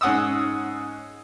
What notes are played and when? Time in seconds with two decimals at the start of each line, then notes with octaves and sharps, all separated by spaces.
0.01 G#2 C#4 F#5 D#6 E6